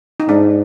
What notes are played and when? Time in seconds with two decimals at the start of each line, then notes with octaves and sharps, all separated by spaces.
0.20 D#4
0.28 G#2 D4